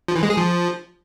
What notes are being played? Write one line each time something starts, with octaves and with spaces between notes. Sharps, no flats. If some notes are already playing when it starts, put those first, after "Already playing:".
F3
E3
G#3
G#4
F3